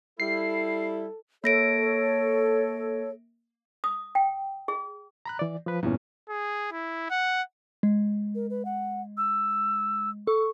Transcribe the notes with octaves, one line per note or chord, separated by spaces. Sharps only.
G3 E4 A4 C7
A#3 A4 C#5 A#6 D7
D#6
G5
G#4
A#5 B5 F#6
E3 D5
F3 B4
E2 G2 A#2 C#4
G#4
E4
F#5
G#3
A#4
B4
F#5
E6
A4 C#6